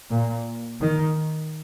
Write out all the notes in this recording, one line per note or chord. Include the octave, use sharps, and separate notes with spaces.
A#2
D#3